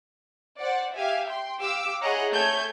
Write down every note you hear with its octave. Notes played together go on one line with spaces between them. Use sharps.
C5 D5 F#5
G4 E5 F5 G#5
G5 C6
G4 F5 D6 E6
E4 G#4 C#5 D#5 F#5 A#5
A3 A4 C#5 G#5 G6 G#6